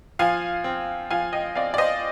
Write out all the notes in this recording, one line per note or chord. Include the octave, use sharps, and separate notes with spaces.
F3 F5 G#5
C4
F3 F5 G#5
D#5 G5
C4 D5 F5
D5
C5 D#5